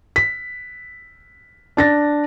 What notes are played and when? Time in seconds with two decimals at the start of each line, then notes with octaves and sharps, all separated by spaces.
0.16 B6
1.77 D4 A6 A#6